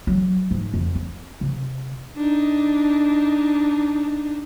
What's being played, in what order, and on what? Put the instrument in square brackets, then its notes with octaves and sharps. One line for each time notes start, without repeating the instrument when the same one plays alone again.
[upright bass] F#3
G#2
F2
C4
C3
[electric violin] D4 D#4